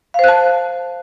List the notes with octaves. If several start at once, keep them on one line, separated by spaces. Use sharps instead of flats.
C5 F5 A5 F#6